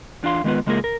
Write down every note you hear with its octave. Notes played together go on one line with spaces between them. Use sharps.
E2 D4 F4 F5 C6
D#3 G#3 B3 F4 B4
C#3 G#3 A#3 F4 G#4 A#4
A#4